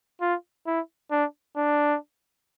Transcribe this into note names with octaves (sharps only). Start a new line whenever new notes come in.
F4
E4
D4
D4